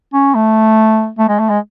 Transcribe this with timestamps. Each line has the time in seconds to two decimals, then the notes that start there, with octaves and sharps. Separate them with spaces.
0.13 C#4
0.34 A3
1.18 A3
1.28 G#3
1.39 A3
1.49 G#3